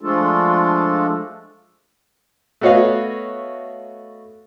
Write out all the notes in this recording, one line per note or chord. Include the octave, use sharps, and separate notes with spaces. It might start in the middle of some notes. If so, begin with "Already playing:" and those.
F3 G#3 A3 D4 F4 A4
A3 B3 F#4 C#5 D#5 F5